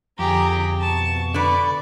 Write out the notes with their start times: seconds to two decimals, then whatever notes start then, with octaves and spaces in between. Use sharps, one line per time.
0.19 F2 D3 G4 G#4 A#5
0.80 B2 A5 C#6
1.34 D3 B4 D5